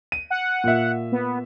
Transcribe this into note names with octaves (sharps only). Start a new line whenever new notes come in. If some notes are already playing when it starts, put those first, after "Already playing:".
D#7
F#5
A#2 E5
B3